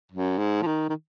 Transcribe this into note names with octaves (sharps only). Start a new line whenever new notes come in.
F#2
G#2
F3
D#3
D#3